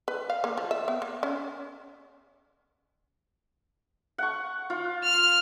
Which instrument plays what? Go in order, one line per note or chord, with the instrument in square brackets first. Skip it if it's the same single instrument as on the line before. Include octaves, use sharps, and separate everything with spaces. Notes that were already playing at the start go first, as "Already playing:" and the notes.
[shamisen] B4
F5
A#3
F3
E5
B3
A#3
C#4
[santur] F#5 C#6
F4
[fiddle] F6